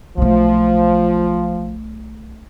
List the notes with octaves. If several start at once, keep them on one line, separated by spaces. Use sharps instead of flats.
B1 F3 A3